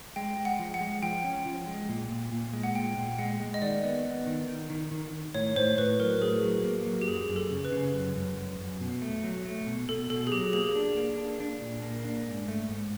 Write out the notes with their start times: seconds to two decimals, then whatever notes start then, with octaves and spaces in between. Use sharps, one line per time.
0.16 G#3 G5
0.37 G#3
0.45 F#5
0.59 F3
0.74 F#5
0.81 G#3
1.02 F3 G5
1.24 C#4
1.46 F3
1.67 G#3
1.89 A#2
2.10 A#2
2.32 A#2
2.54 G#3
2.63 F#5
2.75 A#2 G5
2.97 A#2
3.19 G#3 F#5
3.40 G#3
3.54 D#5
3.62 D#3 D5
3.83 B3
4.05 B3
4.27 D#3
4.48 D#3
4.70 D#3
4.91 D#3
5.13 D#3
5.34 A2 C#5
5.56 A2 C5
5.78 A2 B4
6.00 F#3 A#4
6.21 A2 G#4
6.43 F#3
6.64 A#3
6.86 F#3
7.01 G4
7.07 F#2 G#4
7.29 F#2
7.36 A4
7.51 C#3
7.65 B4
7.72 C#3
7.94 F#2
8.16 F#2
8.37 F#2
8.59 F#2
8.81 B2
9.02 A3
9.24 F#3
9.45 A3
9.67 B2
9.88 B2 A4
10.10 B2 A4
10.27 G#4
10.32 F#3 G4
10.53 A#3 G#4
10.75 D4
10.97 A#3
11.18 D4
11.40 D4
11.61 A#2
11.83 A#3
12.05 D4
12.26 G#2
12.48 A3
12.69 G#2